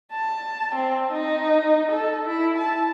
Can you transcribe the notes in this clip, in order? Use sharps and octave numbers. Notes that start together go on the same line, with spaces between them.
A5
C4
D#4
A4
E4
A5